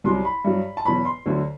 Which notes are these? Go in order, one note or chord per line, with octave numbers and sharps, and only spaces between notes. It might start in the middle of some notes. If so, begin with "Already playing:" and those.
C2 C3 F#3 C6
B5
G2 F#3
A5
E2 B2 F#3 B5
C6
D2 D3 F#3